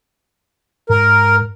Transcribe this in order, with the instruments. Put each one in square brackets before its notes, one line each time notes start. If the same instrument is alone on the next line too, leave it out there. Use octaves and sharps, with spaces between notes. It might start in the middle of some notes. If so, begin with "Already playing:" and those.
[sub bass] G#2 [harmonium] A#4